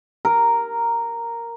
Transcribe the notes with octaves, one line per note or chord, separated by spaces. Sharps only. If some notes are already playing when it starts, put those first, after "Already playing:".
A#4